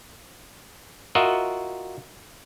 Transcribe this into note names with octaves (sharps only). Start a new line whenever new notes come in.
F4 F#4 A#4 D#5 E5 F#5